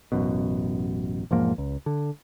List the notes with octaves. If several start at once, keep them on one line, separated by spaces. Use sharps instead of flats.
A1 F#2 B2
E1 G#2 F3 A#3
C#2
D3